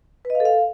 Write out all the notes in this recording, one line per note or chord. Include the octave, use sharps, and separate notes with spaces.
B4
D#5
F5
A4
F5